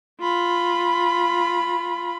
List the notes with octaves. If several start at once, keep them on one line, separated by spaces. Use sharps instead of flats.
F4 B5